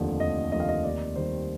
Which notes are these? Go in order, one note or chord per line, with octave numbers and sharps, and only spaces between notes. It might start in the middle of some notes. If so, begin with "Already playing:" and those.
Already playing: F1 D#2 D3 F3
F1 D#5
D#2 D3 F3 D#5
F5
D#5
D#2 D5
D#3 G3 C5